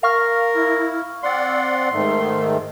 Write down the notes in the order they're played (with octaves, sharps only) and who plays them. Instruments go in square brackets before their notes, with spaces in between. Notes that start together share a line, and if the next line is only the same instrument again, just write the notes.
[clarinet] A#4 [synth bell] F5 C#6 F6
[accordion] E4
[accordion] C4 D5 F#5 [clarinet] C6
[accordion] G#2 D#3 A3